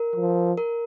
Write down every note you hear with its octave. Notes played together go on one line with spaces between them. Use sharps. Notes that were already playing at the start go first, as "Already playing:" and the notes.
Already playing: A#4
F3
A#4